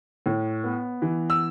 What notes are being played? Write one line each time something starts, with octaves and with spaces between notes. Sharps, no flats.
A2
B3
E3
E6